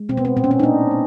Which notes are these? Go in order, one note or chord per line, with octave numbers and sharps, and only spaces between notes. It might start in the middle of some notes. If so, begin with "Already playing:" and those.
Already playing: G#3
B2 C4
B3
C4
A#2 C4
C#4
C4
D#4
A#3 D4
A#3